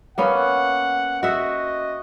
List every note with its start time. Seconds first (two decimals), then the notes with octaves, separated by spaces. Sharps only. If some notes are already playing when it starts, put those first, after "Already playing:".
0.18 A#3 B3 C#4 F#5
1.23 F#4 D#5 E5